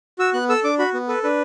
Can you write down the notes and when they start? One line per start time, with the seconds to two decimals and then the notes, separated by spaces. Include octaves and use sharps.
0.19 F#4 E6
0.34 B3 F#6
0.49 A4 E6
0.64 D4 D6
0.79 F#4 B5
0.94 B3
1.08 A4 B4
1.24 D4 B4